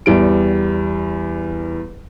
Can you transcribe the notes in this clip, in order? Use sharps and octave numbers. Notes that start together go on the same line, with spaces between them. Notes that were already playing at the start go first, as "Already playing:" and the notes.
E2 G3 D7